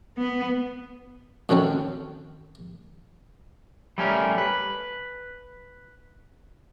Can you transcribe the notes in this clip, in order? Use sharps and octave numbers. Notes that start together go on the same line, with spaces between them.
B3
F#2 D#3 C4 C#4 A4
G3 A3 C#4 A4 A#4
B4